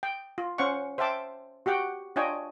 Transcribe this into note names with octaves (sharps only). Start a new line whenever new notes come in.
G5
F4
C#4 C5 F5 F#5 C#6
C5 E5 F5 G5 A5 D6
F#4 G4 F#5 G5
D4 F4 C#5 D#5 G5 G#5